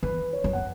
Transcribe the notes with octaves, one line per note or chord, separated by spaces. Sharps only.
E3 B4
C#5
F#2
F#5